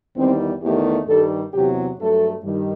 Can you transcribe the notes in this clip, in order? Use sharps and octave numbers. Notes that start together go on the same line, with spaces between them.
E2 D#3 G3 C4
E2 D#3 A3 G4
G2 D#3 G3 A4
E2 C3 F#3 G4
G2 F#3 A3 A4
G2 D#3 G3